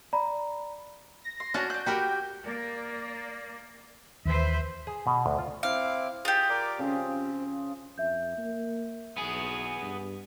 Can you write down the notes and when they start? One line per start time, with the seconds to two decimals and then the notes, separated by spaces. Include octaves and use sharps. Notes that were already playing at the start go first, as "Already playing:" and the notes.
0.13 D5 A#5 B5
1.24 A#6
1.40 C6
1.54 C#4 D4 F#4 A5
1.70 D4 F#6 G6
1.86 F#4 G4 A#4 G5 B5
2.43 A#3 D5
4.25 D#2 E3 B4 C5 E5
4.87 G#4
5.07 B2
5.26 D2
5.39 F4
5.63 C4 E4 F5 D6
6.25 F4 G4 G#4
6.49 A#4 D5 D6
6.79 C#3 F3 C4 G#4
7.98 F2 E5 G6
8.37 A#3
9.17 B1 B3 G#4
9.81 G2